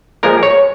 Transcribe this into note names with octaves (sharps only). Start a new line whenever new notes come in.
A#2 F3 G#3 A#4
C#5